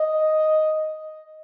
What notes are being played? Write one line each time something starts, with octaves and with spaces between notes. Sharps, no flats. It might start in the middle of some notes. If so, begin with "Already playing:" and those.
Already playing: D#5